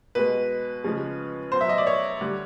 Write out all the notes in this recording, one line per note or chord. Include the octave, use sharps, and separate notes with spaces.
B2 G#3 B4
C#3 F3 G#3
B2 F#3 C5
E5
D#5
D5
C#5
D3 G3